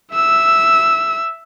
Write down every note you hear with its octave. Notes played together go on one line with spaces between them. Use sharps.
E5 E6